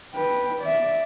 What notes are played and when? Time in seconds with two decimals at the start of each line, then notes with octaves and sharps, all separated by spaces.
0.15 B4 G5
0.63 D5 E5